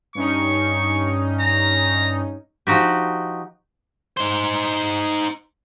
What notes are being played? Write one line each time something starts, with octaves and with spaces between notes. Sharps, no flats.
G2 C#4 D#4 C#6
A#5
F3 D#4 F#4 G4
D#4 C5